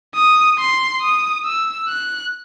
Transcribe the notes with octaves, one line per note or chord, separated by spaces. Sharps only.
D#6
C6
D#6
E6
F#6